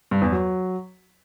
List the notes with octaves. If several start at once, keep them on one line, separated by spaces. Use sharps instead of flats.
G2
E2
F#3